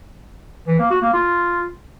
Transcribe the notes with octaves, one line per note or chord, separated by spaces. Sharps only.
E3
A#3
F#4
A#3
F4